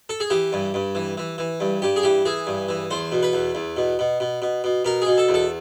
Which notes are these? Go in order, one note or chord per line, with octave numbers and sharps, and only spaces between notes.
A4
G#4
E3 G4
G2
G2
E3
E3
E3
G2
G2 G4
G#4
E3 G4
E3 G#4
G2
E3
E2 C5
B2
B4
E2
E2
B2
B2
B2
B2
B2
B2 A#4
B2 G#4
A4
E2
A4